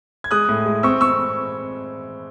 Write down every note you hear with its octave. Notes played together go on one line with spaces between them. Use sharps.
G#6
G#3 D#6 F#6
A2
G#3
C4 C#6 E6
C4 C#6 E6